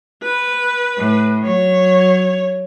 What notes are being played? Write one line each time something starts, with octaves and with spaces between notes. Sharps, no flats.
B4
A2
F#3 C#5